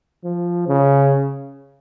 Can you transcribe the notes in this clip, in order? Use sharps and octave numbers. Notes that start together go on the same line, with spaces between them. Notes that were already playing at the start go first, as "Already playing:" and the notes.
F3
C#3